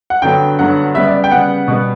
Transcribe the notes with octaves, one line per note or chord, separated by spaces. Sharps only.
F#5
G2 D3 F#3 B3 G5
G2 D3 F#3 B3 F#5
C#3 G3 B3 E5
D5
G5
C#3 G3 B3 F#5
B2 G3 B3